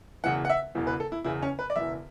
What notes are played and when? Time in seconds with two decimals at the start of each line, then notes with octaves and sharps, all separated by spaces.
0.24 E1 E2 C#3 E3 F#5
0.45 F#5
0.50 E5
0.75 E1 E2 C#3 E3
0.87 B4
1.00 A4
1.12 E4
1.24 E1 E2 C#3 E3 E4
1.42 C#4
1.59 B4
1.70 D5
1.76 E1 E2 C#3 E3 E5